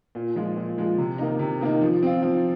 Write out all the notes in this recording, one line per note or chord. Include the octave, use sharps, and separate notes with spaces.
A#2
F3 G#3 F4
A#2
F3 G#3 F4
C3
D#3 A#3 D#4
C3
D#3 A#3 D#4
F3
C4 F4
F3